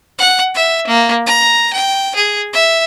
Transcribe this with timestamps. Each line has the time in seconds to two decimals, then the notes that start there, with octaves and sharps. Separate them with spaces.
0.19 F#5
0.55 E5
0.87 A#3
1.27 A#5
1.73 G5
2.16 G#4
2.53 E5